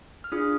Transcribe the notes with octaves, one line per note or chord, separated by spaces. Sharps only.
F6
D4 F4 G#4 D#6